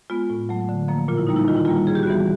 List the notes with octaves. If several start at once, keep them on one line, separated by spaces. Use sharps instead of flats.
G#3 B3 F4
A2
F#3 A3
D3
F3 A#3
A#2 F4
E4
G3 A#3 D#4
E4
D#3 F4
E4
G3 A#3 F4
C#3 G#4
G4
F#4
E3 G3 B3 G4